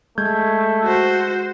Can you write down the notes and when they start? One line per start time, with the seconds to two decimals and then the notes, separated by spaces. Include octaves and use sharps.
0.18 G#3 A3 G6 G#6
0.85 F#4 C5